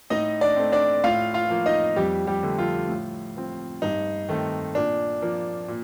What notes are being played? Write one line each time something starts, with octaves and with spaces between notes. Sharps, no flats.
A2 D#4 D#5
D4 D5
A3 C4
D4 D5
A2 F4 F5
F4 F5
F3 A#3
D#4 D#5
F2 G3 G4
G3 G4
D3 A3
F3 F4
A2
F3 C4
G2 D#4
D#3 A3 C4
A#2 D4
F3 A#3
A#2